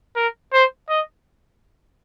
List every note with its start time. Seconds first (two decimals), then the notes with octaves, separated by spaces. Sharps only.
0.16 A#4
0.53 C5
0.89 D#5